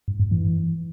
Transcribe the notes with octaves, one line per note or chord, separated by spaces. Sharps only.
G2
G2
E3